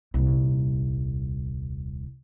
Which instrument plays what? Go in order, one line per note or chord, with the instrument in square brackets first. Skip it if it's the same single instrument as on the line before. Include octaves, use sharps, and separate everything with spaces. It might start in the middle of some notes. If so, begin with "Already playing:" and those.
[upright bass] D#1 C2